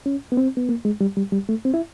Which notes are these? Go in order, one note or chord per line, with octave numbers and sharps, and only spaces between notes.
C#4
B3
C4
B3
A#3
G#3
G3
G3
G3
A3
C4
E4